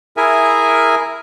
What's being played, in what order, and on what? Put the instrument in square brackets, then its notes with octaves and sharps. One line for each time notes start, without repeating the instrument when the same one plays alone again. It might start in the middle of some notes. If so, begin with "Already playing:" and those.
[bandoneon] E4 G#4 A#4 E5 G#5